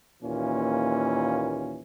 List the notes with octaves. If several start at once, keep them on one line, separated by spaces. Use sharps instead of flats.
D#2 A#2 E3 C#4